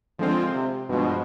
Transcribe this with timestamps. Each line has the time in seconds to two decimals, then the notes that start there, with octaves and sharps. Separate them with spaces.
0.19 D3 F3 G#3 C4 F4
0.54 C3
0.89 G2 B2 F3 G#3